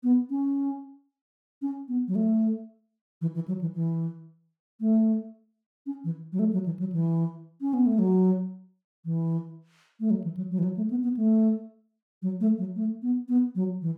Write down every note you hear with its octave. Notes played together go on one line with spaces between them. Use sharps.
B3
C#4
C#4
B3
F#3
A3
E3
E3
F#3
E3
E3
A3
C#4
E3
F#3
A3
F#3
E3
F#3
E3
C#4
B3
A3
F#3
E3
A3
F#3
E3
F#3
F#3
E3
F#3
A3
B3
B3
A3
F#3
A3
F#3
A3
B3
B3
F#3
E3